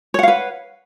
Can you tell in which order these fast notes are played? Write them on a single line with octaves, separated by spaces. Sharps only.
C#5 F#5 F5 B4